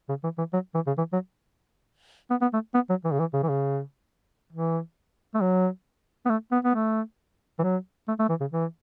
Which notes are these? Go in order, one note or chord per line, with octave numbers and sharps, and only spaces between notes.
C#3
E3
E3
F#3
E3
C#3
E3
F#3
B3
B3
A3
B3
F#3
E3
C#3
E3
C#3
E3
C#3
E3
A3
F#3
B3
A3
B3
B3
A3
E3
F#3
A3
A3
E3
C#3
E3